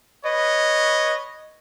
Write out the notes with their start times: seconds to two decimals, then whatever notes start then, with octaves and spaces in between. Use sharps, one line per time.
0.24 B4 C#5 D#5